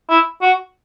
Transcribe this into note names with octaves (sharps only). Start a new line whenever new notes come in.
E4
F#4